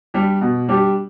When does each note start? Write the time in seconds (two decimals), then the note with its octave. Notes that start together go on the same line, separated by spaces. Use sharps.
0.14 G3 D4 G4
0.41 B2
0.68 G3 D4 G4